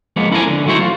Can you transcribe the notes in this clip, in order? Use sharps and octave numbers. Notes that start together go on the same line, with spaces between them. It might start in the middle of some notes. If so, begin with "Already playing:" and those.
F3 G#3 A#3 B3
C#4 E4 A4 A#4 G#5
D3
D#3 F#3 A3 E4 F#4 C5
F4